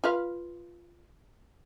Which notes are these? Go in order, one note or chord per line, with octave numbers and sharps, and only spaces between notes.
F4 B4 F5